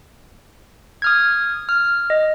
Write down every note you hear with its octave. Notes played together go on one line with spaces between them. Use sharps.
D#6 F6 G#6
F6
D#5